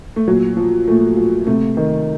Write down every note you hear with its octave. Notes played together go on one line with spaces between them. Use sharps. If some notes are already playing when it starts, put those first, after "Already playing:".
A3
A#2 F#3
F3
A#2 A3
F3
C3 A3
D#3